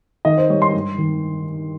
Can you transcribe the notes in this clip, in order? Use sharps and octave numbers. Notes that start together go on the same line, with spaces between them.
D#3 D#5
C5
G3 C#5
C6
G2
D#3